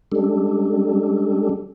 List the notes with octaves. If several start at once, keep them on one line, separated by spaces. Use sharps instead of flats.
G3 G#3 C#4 D4 G4 A4